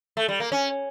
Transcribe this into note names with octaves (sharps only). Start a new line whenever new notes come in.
A3
G3
A#3
C#4